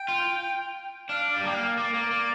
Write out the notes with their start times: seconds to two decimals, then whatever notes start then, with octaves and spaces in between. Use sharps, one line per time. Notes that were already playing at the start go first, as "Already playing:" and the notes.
Already playing: G5
0.08 F4
1.09 D4 F5
1.33 G3 D5
1.44 A#3 G5
1.55 F5
1.77 A#3 D5
1.94 A#3
2.11 A#3